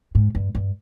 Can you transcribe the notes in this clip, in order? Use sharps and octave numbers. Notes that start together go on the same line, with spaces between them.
G#2
G2
G2